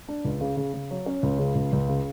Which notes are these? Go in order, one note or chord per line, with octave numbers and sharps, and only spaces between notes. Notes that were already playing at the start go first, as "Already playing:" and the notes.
D4
C#2
C#3
C#3
C#3
F#3
C#4
C#2
C#3
C#2
C#2
C#3